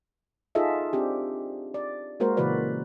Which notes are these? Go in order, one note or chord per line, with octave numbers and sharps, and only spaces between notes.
D#4 F4 G#4 A4 D#5 E5
C4 D4 G4
D5
G#3 A#3 F#4 A#4 C5
A#2 C#3 E3 F#4 B4 D5